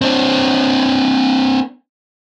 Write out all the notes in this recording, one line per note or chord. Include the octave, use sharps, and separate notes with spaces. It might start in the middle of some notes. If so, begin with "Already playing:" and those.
C4 D4